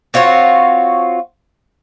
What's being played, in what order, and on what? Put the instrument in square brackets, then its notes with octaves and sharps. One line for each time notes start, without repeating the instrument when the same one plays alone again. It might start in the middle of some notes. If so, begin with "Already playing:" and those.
[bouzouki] C4 F4 F#4 C#5